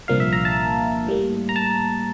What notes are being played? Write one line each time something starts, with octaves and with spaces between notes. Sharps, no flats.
C2 A#2 F3 A#3 D4 F5
E5
A#5
A5
A2 G3 A#3
A#5
A5